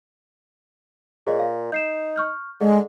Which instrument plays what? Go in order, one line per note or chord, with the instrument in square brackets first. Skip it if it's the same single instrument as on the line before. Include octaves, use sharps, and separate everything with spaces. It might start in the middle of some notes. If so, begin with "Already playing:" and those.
[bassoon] A#2 [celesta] G#4 C#5 D#5
[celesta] F5
[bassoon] D#4 [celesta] G6 C7 E7
[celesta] C#6 F6 G6
[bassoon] D3 [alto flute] G#3 [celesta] G#4 D#5